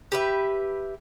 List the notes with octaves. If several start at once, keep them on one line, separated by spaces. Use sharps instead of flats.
G4 B4 E5